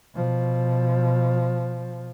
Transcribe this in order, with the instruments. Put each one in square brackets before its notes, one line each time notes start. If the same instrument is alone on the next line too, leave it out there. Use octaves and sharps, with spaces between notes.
[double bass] B2 F3